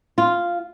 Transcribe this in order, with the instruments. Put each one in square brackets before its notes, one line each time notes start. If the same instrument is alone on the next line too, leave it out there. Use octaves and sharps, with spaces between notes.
[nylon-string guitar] F4